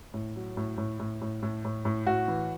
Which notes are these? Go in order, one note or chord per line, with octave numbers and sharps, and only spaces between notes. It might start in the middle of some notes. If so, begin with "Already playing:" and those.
A2
F#3
A2
A2
A2
A2
A2
A2
A2
A2 F#4
E3